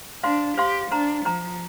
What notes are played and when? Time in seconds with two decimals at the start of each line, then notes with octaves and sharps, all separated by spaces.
0.23 D4 C5 F5 C6
0.58 G4 C5 F5 C6
0.91 D4 C5 A#5
1.25 F3 C5 A#5